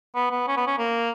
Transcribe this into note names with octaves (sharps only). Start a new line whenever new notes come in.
B3
B3
C#4
B3
C#4
A#3